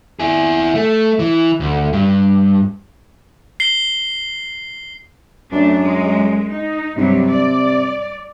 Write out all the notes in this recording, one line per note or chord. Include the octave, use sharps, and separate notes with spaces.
E4 G#4
A3
E3
D2
G2
C7 G7
F#2 A3 D4
G#3
D#4
G2 C3 F#3 G3
D5